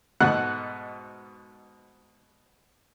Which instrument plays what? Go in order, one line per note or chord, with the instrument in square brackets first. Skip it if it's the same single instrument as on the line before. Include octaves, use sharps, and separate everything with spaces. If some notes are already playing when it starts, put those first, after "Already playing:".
[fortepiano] G#2 B2 A3 F#5 F#6